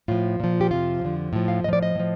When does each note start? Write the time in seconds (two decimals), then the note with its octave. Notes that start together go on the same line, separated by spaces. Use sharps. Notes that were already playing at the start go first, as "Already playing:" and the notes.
0.08 A2 F3 F4
0.40 A#2 F3
0.61 G4
0.71 F2 C3 F3 F4
1.01 F2 D3 F3
1.33 A2 F3
1.48 F5
1.64 A2 D#5
1.68 F3 D5
1.83 D#5
1.95 A2 F3